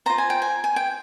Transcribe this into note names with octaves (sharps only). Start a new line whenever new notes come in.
F4 C5 A#5
G#5
G5
G#5
G#5
G5